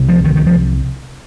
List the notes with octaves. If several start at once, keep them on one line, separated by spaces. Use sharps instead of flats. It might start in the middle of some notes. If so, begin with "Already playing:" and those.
Already playing: C2 C3
F3
D#3
D#3
F3